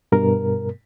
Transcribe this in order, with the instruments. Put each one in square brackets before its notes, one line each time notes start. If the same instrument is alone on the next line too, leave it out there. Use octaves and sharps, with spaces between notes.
[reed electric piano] G2 B2 A#4